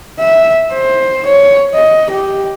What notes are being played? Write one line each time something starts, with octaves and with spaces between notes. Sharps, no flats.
E5
C5
C#5
D#5
G4